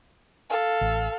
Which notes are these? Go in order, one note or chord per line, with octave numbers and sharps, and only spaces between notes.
A4 F5
A1